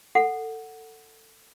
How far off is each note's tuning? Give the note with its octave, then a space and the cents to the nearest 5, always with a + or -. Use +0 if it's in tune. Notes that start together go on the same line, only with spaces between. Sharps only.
A4 +20 F#5 +0